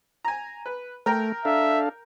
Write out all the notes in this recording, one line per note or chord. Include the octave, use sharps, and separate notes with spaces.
G#5 A#5
B4
A3 A#4 G5 A#5
D4 A4 E5 F5